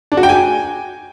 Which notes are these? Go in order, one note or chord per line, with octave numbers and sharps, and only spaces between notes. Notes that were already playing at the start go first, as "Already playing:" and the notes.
D4
F#4
G5
G#5